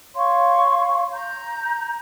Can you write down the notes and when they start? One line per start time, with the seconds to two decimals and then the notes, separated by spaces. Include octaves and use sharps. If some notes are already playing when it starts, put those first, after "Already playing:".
0.14 C#5 F5 C6 C#6
1.14 A#5 G6